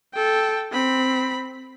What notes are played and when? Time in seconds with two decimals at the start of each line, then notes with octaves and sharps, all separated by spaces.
0.14 A4 G5
0.72 C4 B5